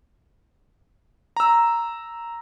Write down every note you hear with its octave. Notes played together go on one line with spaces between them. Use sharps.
A#5 E6